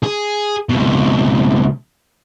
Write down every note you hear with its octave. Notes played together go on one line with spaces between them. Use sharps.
G#4
C#2 B2